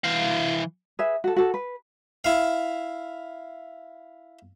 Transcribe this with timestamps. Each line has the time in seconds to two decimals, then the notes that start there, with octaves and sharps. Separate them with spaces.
0.04 E3 F5
0.99 G#4 B4 E5
1.24 F#4 A4
1.36 F#4 A4
1.54 B4
2.25 E4 F5